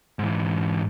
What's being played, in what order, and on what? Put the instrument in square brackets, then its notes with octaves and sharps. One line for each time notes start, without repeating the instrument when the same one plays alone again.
[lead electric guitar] G#2 E3